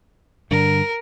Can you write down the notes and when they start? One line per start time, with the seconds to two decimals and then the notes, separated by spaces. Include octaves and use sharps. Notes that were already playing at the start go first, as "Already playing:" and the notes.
0.51 G2 D3 A#4